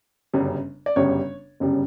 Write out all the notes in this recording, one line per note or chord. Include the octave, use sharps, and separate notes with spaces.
G1 F#2 C#3 G3
D5
G1 F#2 C#3 G3 C#5
G1 F#2 C#3 G3